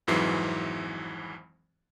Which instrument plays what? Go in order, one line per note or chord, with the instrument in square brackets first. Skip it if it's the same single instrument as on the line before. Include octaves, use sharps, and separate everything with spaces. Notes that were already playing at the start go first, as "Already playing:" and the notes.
[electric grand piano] G#1 F2 G#2 E3 F#3 C7